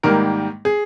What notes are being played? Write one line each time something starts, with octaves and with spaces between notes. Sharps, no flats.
G#2 D#3 G3 A#3 A#4
G#4